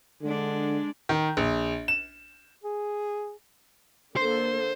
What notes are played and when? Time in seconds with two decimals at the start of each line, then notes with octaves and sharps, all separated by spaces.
0.22 D3 G#3 D4
1.09 D#3
1.37 A#1
1.88 E7
2.64 G#4
4.16 D3 A#3 A4 C5